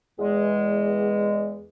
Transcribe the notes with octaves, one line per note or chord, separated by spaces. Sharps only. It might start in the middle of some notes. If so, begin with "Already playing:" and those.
E2 G#3